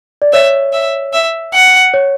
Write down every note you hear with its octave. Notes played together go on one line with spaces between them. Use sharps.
D5
C#5 E5
E5
E5
F#5
C#5